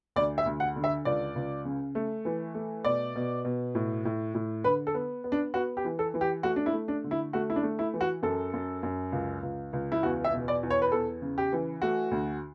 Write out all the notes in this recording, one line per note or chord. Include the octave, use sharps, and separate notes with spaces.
D2 D5
E5
D2
F#5
D3
E5
C#2 D5
C#2
C#3
A3
E3
A3
B2 D5
B2
B2
A2
A2
A2
D3 B4
A4
B3
B3
D4
B3 F#4
G4
E3
A4
E3
G4
A3 F#4
D4
E4
A3
D4
D3
E4
A3 F#4
E4
D4
A3
E4
E3
F#4
F#2 A4
F#2
F#2
C#2
C#2
C#2
E4
E2 F#4
E5
B2
D5
E2
C#5
B4
E2 A4
C#3
G4
E3
A3 F#4
D2